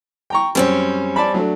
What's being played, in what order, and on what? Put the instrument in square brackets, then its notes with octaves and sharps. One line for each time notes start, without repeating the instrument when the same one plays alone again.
[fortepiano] G5 A#5 C#6
[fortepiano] F#2 [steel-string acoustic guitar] G3 C4 C#4
[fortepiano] D5 A5 B5
F#3 A3 D4